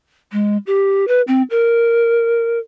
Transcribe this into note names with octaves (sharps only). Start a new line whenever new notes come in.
G#3
G4
B4
C4
A#4